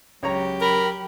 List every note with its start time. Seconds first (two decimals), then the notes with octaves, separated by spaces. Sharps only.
0.23 C#2 F#3 G4 C#5 A#5
0.61 A#4 B5